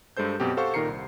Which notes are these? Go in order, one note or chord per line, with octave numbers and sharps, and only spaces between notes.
G2 G#3 A4 C5 G6
F#2 B2 C4 G4
G4 A4 C5 F5 F#5 C#6
A#2 D#3 A#4 A#5 C7 C#7
C2